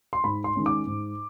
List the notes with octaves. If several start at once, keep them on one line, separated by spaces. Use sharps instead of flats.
C6
G#2 B5
C6
D#3 G#3 C#4
D6
G#2